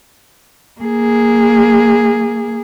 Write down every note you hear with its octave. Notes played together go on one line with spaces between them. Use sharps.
A#3 G#4